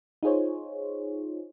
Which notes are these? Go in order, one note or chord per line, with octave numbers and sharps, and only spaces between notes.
D#4 F4 G#4 C5 C#5